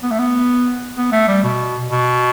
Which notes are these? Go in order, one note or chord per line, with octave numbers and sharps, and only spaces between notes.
B3
A3
B3
B3
A3
G3
B2
B2